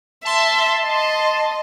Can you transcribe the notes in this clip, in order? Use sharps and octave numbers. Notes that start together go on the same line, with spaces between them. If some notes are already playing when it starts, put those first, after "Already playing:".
E5 A5 C6
D#5